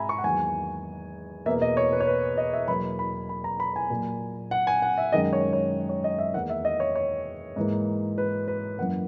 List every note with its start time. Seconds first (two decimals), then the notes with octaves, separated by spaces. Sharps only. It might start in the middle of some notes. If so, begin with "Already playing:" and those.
Already playing: G#2 G#3 E5 G#5 A#5 B5
0.09 C#6
0.18 F#5
0.24 E2 D#3 F#3 A#3 G#5
1.46 E2 B2 A#3 E5
1.62 D#5
1.77 C#5
1.92 B4
2.00 C#5
2.07 B4
2.37 D#5
2.53 E5
2.68 E2 B2 F#3 A#3 B5
2.99 B5
3.29 B5
3.44 A#5
3.60 B5
3.76 G#5
3.90 A#2 F#3 A#3
4.51 F#5
4.67 G#5
4.82 F#5
4.98 E5
5.12 F#2 D#3 G#3 D#5
5.33 C#5
5.53 C#5
5.89 C#5
6.04 D#5
6.19 E5
6.34 E2 D#3 A#3 F#5
6.49 E5
6.65 D#5
6.80 C#5
6.95 C#5
7.56 G#2 E3 A#3
8.18 B4
8.48 B4
8.78 F#2 E3 A#3 F#5